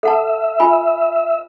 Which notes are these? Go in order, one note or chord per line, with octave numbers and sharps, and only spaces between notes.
A4 E5 F#5 A5
F4 G#5 B5